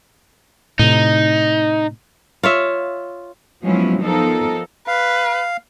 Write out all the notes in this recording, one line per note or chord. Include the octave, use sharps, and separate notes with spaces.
A2 C3 D#4
F4 C#5 E5
F3 F#3 G#3 B3 C#4 E4
F3 B3 D#4 A4 A#4
B4 F5